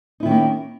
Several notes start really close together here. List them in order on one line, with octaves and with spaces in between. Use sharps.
D#4 E4 D#3 C#4 A#3